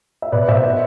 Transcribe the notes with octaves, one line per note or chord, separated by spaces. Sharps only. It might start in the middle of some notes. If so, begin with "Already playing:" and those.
E5
B2 B4 D5
B2 C5 E5
B3